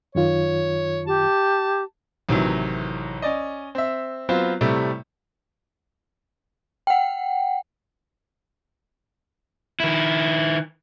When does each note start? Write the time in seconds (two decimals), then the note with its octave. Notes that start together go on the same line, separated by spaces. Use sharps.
0.15 F#2 D#3 F4 C#5
1.07 G4 A5
2.29 A1 C3 D#3 E3 F#3
3.22 C#4 D5 D#5
3.75 C4 E5
4.29 F#3 B3 C4 F4 C5
4.61 A2 C3 G3 A3
6.87 F#5 G5
9.80 D#3 E4